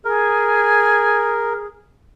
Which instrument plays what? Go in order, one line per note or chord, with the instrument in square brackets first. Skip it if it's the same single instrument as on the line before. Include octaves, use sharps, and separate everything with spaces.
[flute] G#4 [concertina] A#4